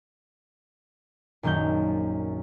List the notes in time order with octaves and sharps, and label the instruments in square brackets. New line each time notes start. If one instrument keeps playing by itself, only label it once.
[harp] A#1 F#2 D#3 C#4 G6